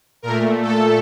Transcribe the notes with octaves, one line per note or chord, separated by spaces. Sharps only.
A#2 A3 A#4
A4